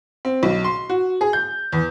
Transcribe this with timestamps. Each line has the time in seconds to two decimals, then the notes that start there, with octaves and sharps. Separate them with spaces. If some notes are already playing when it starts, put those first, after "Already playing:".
0.25 C4
0.43 B1
0.65 C6
0.90 F#4
1.21 G#4
1.33 G6
1.72 E2